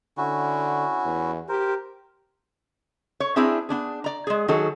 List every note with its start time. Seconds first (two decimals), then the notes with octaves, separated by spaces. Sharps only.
0.18 D3 C#4 E4 F#4
1.05 E2
1.49 G4 A#4 C5
3.20 C#5
3.36 C4 D4 E4 G#4 C5 E5
3.69 B3 D4 G#4
4.04 D5 A#5
4.27 G#3 G#4
4.48 D#3 F#3 G#4 A4